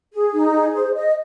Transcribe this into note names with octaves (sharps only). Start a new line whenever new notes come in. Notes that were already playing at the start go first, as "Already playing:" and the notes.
G#4
D#4
G#4
C5
D#5